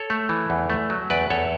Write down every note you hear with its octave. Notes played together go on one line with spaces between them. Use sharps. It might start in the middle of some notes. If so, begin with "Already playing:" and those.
Already playing: A4 C#5
A3
E3
E2
A3
F#3
E2 B4 D5
E2 A4 C#5